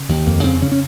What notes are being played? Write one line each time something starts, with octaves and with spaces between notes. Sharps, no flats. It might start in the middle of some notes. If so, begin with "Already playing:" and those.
Already playing: C#3
D#2
F2 A#3
C#3 C4
C#3 C#4
C#4